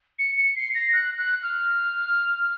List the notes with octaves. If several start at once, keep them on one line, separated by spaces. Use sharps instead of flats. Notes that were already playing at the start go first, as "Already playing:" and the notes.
C#7
C#7
C7
A#6
F#6
F#6
F6